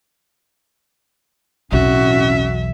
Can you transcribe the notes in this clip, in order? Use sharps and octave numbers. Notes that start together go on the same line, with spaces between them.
B1 E2 A2 C4 C#4 F#4 E5